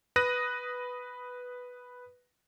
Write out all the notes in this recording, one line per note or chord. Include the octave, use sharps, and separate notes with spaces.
B4 D#6 F#6 A#6 D#7